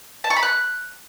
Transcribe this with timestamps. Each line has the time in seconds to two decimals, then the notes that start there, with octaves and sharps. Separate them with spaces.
0.24 A5
0.30 C#6
0.36 B5
0.43 F#6